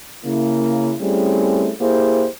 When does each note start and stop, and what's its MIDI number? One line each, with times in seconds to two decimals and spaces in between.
0.25 0.95 49
0.25 0.95 58
0.25 0.95 64
1.01 1.72 55
1.01 1.72 57
1.01 1.72 60
1.01 1.72 61
1.01 1.72 64
1.01 1.72 68
1.81 2.28 58
1.81 2.28 64
1.81 2.28 67
1.81 2.28 68
1.81 2.28 72